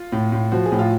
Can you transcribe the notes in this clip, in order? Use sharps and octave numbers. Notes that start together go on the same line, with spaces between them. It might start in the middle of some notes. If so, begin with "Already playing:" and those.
Already playing: F4
A2
A2
F3 F#4
G#4
A2
F4